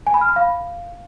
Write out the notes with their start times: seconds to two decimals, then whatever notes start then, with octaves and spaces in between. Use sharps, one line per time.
0.07 G#5
0.14 B5
0.21 F6
0.29 B5
0.36 F5